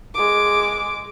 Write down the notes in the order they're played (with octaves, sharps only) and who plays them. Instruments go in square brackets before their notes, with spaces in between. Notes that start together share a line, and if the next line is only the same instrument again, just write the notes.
[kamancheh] G#3 D6